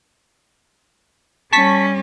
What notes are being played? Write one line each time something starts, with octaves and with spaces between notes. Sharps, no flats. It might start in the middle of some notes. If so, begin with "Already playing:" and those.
G3 C#4 A5 C#6 B6